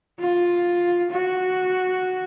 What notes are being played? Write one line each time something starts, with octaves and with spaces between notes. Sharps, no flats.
F4
F#4